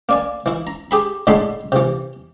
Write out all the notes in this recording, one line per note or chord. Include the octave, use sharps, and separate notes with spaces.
A#3 D5 G#5
E3 E4
A#5
G4 G#4 B5
A2 D3 G#3 A4 B5 C6
C3 E3